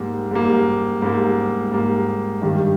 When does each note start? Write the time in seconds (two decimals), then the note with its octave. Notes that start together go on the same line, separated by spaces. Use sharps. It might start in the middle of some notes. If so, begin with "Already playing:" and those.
Already playing: G#2 G3 A#3
0.31 G#2 G3 A#3
1.02 G#2 G3 A#3
1.72 G#2 G3 A#3
2.42 G2 D#3 G3